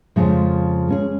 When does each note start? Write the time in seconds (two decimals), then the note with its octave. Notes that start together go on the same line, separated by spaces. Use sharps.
0.16 F2 C#3 F3 G#3
0.88 G#3 C#4 G#4